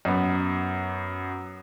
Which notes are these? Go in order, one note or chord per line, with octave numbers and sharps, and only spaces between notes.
F#2 B3